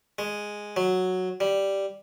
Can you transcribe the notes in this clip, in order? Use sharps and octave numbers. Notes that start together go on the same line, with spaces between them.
G#3
F#3
G3